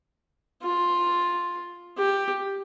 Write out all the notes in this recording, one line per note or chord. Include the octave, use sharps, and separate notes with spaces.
F4
G4